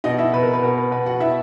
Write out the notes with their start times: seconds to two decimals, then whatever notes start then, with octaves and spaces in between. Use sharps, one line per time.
0.04 B2 D#4 D#5
0.18 E4 E5
0.33 B2 B4
0.43 A#4
0.53 B4
0.63 B2 A#4
0.78 B4
0.91 B2 B4
1.06 F#4 F#5
1.20 B2 E4 E5